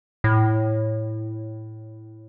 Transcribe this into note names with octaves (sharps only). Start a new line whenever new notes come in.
A2